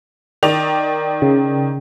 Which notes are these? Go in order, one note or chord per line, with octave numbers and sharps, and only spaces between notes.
D#3 D5 F7
C#3